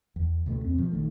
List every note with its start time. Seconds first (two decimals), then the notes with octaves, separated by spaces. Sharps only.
0.16 E2
0.46 C#2 B2 A3
0.62 E2 C4
0.75 B2 F3
0.92 A#1 D#3 A3